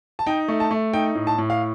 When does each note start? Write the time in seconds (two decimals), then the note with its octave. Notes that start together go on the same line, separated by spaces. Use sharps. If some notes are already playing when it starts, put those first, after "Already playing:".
0.19 A5
0.26 D#4 G5
0.48 A3
0.60 A5
0.71 A3
0.94 D#4 G5
1.15 A2
1.27 A5
1.38 A2
1.50 F5